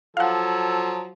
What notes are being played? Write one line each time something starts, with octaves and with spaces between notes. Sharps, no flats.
F3 F#3 A4 F5 F#5